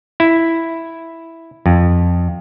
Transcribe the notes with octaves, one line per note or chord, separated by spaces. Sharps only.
E4
F2